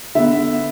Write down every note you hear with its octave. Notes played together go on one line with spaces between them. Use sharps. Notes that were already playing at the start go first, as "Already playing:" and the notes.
D3 B3 E5